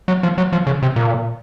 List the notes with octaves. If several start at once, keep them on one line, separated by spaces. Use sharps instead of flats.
F#3
F3
F#3
F3
C#3
C3
A#2